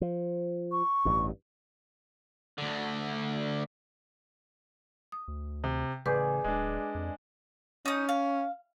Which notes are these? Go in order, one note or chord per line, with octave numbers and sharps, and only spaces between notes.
F3
C#6
A1 G2
D2 D3
D#6
D2
C3
A1 C#3 G#4 B4 D5 G6
D1 G#3 D4
F2
C#4 D#4 D#6
F5